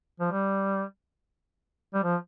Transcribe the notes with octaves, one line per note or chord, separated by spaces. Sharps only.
F3
G3
G3
F3